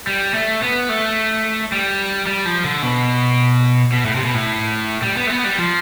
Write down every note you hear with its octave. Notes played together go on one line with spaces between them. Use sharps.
G3
A3
B3
A3
G3
G3
F3
D3
B2
B2
A2
C3
B2
A2
G3
B3
A3
B3
G3
F3